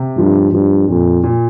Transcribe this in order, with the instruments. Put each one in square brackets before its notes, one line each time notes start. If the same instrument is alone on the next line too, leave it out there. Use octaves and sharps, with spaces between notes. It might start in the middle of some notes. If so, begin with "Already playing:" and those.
Already playing: [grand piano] C3
[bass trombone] G2 [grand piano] F3
[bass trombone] G2 [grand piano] F3
[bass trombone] F2 [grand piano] A#2
[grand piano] A#2